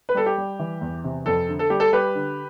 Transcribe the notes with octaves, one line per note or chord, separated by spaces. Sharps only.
B4
G3 A4
G4
G3
E3
E2
C3
F2 A4
D3
A4
G3 G4
A4
G3 G4 B4
D3